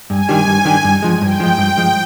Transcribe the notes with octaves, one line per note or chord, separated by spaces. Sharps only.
G2 G#5
D#3 G3 D4 G4
G2 G#5
D#3 G3 D4 G4
G2
F3 G#3
G2 G5
F3 G#3
G2
F3 G#3